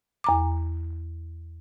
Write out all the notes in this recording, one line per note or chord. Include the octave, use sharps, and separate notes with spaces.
E2 A#5 D6